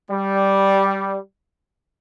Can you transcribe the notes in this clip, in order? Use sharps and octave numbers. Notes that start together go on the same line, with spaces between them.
G3